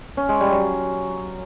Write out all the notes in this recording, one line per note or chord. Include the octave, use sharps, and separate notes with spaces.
C#4
G#3
G3
F#3